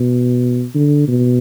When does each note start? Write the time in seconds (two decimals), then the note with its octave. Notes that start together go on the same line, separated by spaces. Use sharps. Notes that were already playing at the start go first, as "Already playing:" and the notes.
Already playing: B2
0.74 D3
1.08 B2